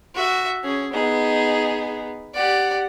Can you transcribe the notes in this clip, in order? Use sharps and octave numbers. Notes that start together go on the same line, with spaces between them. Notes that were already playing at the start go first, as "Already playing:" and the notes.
F#4 E5
C#4 G#4
B3 D#4 G#4
G4 D5 F#5